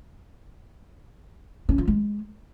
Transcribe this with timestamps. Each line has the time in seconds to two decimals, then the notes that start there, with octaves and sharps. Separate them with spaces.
1.69 C#4
1.78 F4
1.88 G#3